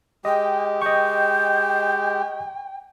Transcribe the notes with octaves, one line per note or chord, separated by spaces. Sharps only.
G#3 G4 D#5 G5
D#5 G5 C#6 G6